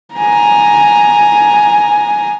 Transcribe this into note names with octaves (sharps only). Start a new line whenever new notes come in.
G#5 A#5